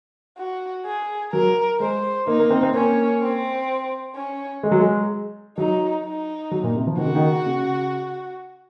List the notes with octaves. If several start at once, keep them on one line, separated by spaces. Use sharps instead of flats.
F#4
G#4
F#3 A#4
G#3 C5
A#3 D#4
A#3
C4
C4
A#3 C#4
C4
C#4
G#3
F#3
G#3
F#3 D#4
D#4
F#3
A#2
C3
F3
D#3 F#4
C#3
D#3
C#3